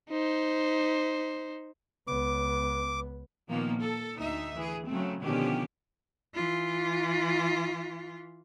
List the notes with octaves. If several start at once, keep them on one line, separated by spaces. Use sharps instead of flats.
D#4 C5
C#2 B3 D6
A#2 D#3 F3 A#3 B3
A4
D2 D#4 E5
E3 G#4
C#3 F#3 A3 C4
B2 D3 D#3 F3 C#4 G4
E3 F4